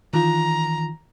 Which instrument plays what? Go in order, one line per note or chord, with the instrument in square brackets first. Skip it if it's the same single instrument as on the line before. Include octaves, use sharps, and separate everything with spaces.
[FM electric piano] D#3 E3 F4 [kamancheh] A#5